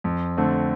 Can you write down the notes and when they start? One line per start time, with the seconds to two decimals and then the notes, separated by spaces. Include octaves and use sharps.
0.04 F2
0.37 D3 A3 C4